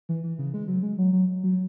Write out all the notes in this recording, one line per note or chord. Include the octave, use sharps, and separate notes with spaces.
E3
E3
C#3
G#3
F#3
G#3
F#3
F#3
F#3